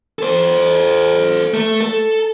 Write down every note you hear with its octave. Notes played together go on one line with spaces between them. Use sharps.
A4 C5
A3
A4